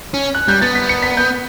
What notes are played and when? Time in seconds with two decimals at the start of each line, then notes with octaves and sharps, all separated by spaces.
0.14 C#4
0.35 F#6
0.48 G3 G6
0.61 B3 A6
0.75 B6
0.89 C#7
1.02 B6
1.17 G6